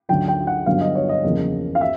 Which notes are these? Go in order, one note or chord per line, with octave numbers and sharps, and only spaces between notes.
D2 D3 F#3 G5
G5
F#5
G2 D3 F#3 B3 F5
D#5
C#5
D#5
F#1 E2 C#3 F3 A#3
F5
E5